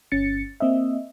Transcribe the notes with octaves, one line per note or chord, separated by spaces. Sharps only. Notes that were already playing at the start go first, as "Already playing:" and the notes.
G1 C#4 A6 C#7
A#3 C4 D#5 E5